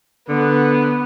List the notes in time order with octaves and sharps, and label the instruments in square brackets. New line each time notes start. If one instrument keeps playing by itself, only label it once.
[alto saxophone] D3 [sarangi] B3